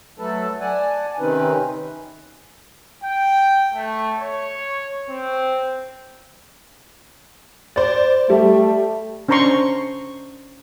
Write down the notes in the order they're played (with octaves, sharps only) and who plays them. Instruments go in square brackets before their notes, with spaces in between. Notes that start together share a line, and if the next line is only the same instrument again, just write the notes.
[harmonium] F#3 A3 A4 B4 A5
D5 F#5 G#5 A5
C3 D#3 C4 C#4 D#4 B4
[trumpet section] G5
A3
C#5
C4
[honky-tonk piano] C5 D5
[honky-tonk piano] G3 [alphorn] A3
[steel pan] C#4 D4 C5 A#5 C6 C#6